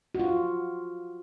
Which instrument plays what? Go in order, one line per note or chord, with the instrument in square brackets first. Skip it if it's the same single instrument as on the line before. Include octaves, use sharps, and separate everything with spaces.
[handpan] F#4
F4